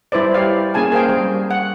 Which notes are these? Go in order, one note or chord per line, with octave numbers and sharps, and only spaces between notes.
G3 E4 B4 C5 D5
G4 C#5 D5 F5
A#3 C#4 G#4 G#5 A5
G#4 A#4 C5 F5 G5
G3
F#5